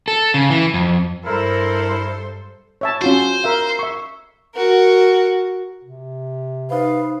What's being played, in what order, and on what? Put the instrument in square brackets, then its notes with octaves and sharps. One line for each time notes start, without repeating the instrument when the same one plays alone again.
[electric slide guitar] A4
C#3
E3
F2
[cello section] G2 A4 C5 [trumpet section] E4 A#4
[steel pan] C#5 E5 A5
[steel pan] C#4 F4 F#4 [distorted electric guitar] C5
[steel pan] A#4 E5 F5
E5 C#6
[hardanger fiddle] F#4 A#4
[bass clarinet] C3
[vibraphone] D#4 C5 [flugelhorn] B4 [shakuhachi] F5